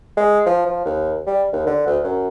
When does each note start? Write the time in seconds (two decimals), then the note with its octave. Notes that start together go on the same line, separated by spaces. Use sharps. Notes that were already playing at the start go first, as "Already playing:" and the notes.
0.17 G#3
0.47 F3
0.66 F3
0.86 D#2
1.27 G3
1.53 D#2
1.66 D3
1.86 D2
2.03 F#2